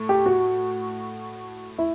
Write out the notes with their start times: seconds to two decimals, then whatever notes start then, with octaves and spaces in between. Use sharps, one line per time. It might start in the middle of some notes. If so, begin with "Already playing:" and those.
Already playing: A2 A3
0.09 G4
0.26 F#4
1.78 E4